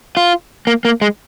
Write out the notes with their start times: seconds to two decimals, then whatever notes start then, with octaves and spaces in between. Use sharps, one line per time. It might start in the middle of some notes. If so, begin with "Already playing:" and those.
0.17 F4
0.67 A#3
0.85 A#3
1.01 G#3